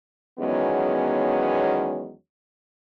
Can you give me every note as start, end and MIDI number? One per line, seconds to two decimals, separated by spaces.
0.39 2.12 40
0.39 2.12 51
0.39 2.12 54
0.39 2.12 56
0.39 2.12 59
0.39 2.12 61